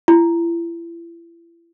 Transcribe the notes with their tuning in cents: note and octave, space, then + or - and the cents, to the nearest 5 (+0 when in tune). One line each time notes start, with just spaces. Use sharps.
E4 +35